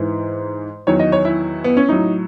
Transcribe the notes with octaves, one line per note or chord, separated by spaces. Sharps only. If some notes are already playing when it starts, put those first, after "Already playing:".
Already playing: G#2 E3
E2 D#3 F#3 C#5
D#5
C#5
E4
B3
C#4
A2 F#3 D#4